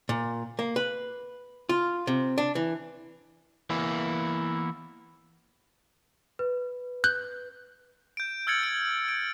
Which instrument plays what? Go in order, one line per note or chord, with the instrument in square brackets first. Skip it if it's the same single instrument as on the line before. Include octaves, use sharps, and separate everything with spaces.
[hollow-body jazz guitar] A#2
A#3
B4
F4
C3
D4
E3
[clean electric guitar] E3 A#3 B3 E4
[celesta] B4
[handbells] F#6 G6
[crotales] G6 D7
E6 F6 G#6 A6 C#7 F#7
D7
D7